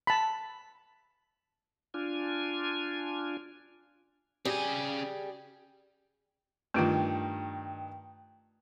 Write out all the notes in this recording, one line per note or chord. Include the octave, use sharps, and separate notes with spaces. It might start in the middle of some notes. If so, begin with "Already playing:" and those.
A5 B5
D4 F4 G#5
C#3 G3 G4 G#4 G#5
G2 D#3 A3 F4 G5